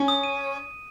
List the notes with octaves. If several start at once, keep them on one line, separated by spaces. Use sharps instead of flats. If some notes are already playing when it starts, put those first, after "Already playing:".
Already playing: C#4
D#6
D#7